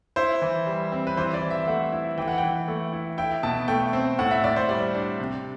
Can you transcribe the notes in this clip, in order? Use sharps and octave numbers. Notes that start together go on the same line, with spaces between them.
E4 C5
E3
G3
C4
B4
E3 C5
D5
E3
E5
A3 F#5
E4
E3 G5
F#5
G5
E3
A3
E4
E4 G5
B2 A5
A3 G5
C4
A2 F#5
E5
A2 D5
C5
G3 D5
D4
C3